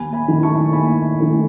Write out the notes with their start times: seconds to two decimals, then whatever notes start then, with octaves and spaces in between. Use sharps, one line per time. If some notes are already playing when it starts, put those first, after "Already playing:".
Already playing: D#2 G#5 B5
0.13 G#5 B5
0.28 D#3 A3 E4
0.43 A5 C#6
0.73 D#2 G#5 B5
1.19 D#3 A3 E4